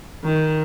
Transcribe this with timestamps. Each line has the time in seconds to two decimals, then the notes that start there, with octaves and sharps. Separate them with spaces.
0.24 D#3